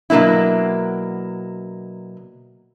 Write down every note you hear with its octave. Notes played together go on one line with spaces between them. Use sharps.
B2 F#3 A#3 D4 E4